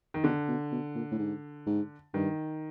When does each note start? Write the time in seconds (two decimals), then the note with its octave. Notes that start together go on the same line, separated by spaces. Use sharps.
0.14 D#3
0.24 B2 D3
0.48 B2
0.72 B2
0.95 A#2
1.11 A2
1.19 G#2
1.66 G#2
2.14 G2 D#3